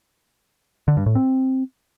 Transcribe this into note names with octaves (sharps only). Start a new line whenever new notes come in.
D3
G2
A2
C4